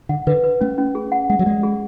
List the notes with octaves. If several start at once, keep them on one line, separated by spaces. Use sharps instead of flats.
D3 F#5
D3 B4
B4
A3 C#4
C#4
G#4
F#5
G#3 F#5
F#3
G#3 D5
G#4